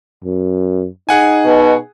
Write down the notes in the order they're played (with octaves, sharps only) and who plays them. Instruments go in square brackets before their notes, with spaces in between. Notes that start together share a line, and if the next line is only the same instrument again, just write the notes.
[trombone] F#2
[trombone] D#4 [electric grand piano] G#4 F#5 G#5
[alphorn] B2